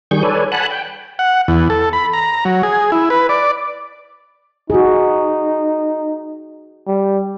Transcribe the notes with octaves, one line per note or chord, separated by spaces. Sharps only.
D#3 G3 G#4 C#6 G6
A4 B4 C#5 D5 G#5
F#5 G#5 A5 B5 F#6
G5
F#5
E2
A4
B5
A#5
F#3
G#4
E4
B4
D5
D#4 F#4 G#4
G3